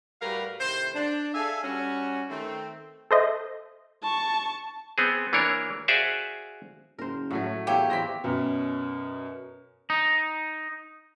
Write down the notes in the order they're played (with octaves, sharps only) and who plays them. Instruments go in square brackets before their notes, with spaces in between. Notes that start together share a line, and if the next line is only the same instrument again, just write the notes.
[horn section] A2 G3 F#4 A#4 B4 F5
A2 C3 D#3 C5
D4
G#4 A4 D5 E5 F5 G#5
G3 C#4 F#4
D#3 A3 C4
[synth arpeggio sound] A4 C5 D#5 E5
[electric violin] A5 C#6
[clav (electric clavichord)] B3 C4 G#4
E3 A#3 D4 A#4 C#5
F#4 G#4 C5 D5 E5 F5
[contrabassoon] F#1 [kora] A#4 C5
[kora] A2 F#3 [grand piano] A3 F#4
[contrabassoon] E2 [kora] A#3 C#5 E5 [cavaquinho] G4
[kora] E3 C4 [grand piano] A#6 B6
[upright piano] F#2 B2
[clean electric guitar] D#4